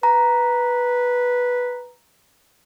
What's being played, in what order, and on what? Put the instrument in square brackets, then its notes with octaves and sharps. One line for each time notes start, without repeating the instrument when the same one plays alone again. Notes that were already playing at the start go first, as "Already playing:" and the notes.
[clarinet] B4 [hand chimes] A#5